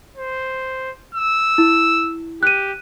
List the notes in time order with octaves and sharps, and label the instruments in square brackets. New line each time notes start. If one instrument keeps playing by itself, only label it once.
[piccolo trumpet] C5
E6
[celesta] E4
[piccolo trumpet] G4 [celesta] F#6 D#7